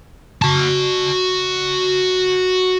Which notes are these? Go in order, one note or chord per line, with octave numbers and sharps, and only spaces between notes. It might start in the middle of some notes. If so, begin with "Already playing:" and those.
F#4 A5